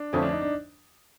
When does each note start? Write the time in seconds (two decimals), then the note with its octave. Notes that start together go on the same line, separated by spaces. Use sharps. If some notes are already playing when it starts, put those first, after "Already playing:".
Already playing: D4
0.13 F2 D3 F3 A3 C#4
0.22 D4
0.32 D#4
0.41 D4